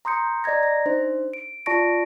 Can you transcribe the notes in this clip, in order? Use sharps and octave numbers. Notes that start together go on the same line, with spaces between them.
A#5 C6 D#6 G6 C#7
D5 D#5 A#5 G#6 A#6
A#6
D4 D#4 C5
D7
F4 D5 A5 C#6 A#6 D7